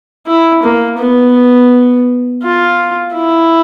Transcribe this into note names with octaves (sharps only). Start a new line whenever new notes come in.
E4
A#3
B3
F4
E4